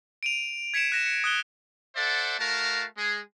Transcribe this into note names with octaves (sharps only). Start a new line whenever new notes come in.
D7 D#7 F7
G#6 B6 C#7 D7 E7 F7
F#6 A#6 E7
C#7
D#6 F#6 G7
A4 C5 D5 E5 F#5
A3 F#4 A#4 F5 A5
G#3 G#4